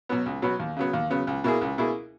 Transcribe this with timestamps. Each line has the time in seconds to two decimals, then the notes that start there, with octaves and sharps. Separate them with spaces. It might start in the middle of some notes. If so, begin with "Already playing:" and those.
0.09 B2 F#3 B3
0.26 C#2
0.42 B2 F#3 B3
0.60 D#2
0.76 C#3 F#3 B3
0.93 D#2
1.10 C#3 F#3 B3
1.27 C#2
1.44 B2 A#3 E4 G#4
1.61 C#2
1.78 B2 A#3 E4 G#4